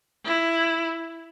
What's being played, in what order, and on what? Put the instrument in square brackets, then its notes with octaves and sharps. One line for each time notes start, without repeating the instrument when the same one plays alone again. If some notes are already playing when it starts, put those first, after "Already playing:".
[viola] E4